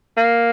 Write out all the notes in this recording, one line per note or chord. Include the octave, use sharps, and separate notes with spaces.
A#3